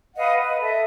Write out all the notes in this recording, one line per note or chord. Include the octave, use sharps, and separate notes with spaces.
B4 D#5 F5 F#5
B4
A4 D#5 E5